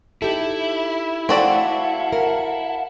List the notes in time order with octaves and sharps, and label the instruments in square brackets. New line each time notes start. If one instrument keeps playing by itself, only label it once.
[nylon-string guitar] D#4 G4 A4 [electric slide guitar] E4
[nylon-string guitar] A3 [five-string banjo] C4 F#4 D5 [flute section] F5 F#5 A5
[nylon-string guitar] A#4